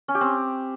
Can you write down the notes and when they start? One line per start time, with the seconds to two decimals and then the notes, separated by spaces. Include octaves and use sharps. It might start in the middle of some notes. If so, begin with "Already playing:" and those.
0.08 C#4
0.15 G4
0.21 C4